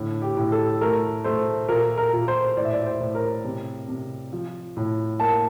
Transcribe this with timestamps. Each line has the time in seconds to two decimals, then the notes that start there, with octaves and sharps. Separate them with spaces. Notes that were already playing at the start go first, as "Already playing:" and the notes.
Already playing: A2 D3
0.22 G4
0.37 A2
0.52 A4
0.81 A3 A#4
1.24 A3 C5
1.69 A#2 A#4
1.98 A#4
2.13 A#2
2.28 C5
2.57 A2 D5
2.65 E5
2.73 D5
2.86 C5
3.00 A2
3.15 A#4
3.44 C3
3.88 C3
4.33 F3
4.77 A2
5.20 A#3 A5